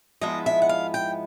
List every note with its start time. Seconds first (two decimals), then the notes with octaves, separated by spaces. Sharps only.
0.21 G#2 F3 G#3 B3 E4 D#5
0.46 E5
0.62 F#5
0.69 F5
0.94 G5